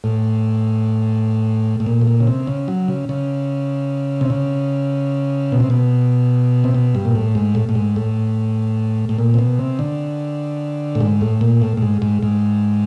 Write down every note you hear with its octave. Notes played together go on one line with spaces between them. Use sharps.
A2
A2
A#2
A2
A#2
C#3
C3
C#3
F#3
C#3
C#3
C3
C#3
B2
C3
B2
C3
B2
G2
A#2
A2
G#2
A2
A2
G#2
A2
A2
A#2
C3
B2
C3
D3
A2
G#2
A2
A#2
A2
A2
G#2
G#2
G#2